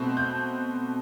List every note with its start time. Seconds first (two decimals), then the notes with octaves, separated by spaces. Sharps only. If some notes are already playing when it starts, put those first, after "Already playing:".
Already playing: B2 A3 C4
0.17 G6